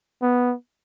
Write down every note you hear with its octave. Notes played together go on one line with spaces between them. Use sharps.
B3